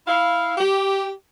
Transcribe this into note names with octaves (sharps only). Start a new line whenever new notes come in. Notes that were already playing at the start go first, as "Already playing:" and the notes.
E4 F5
G4